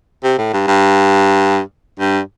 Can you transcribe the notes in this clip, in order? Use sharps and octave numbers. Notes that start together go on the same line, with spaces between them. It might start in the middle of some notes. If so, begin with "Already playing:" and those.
C3
A2
G2
G2
G2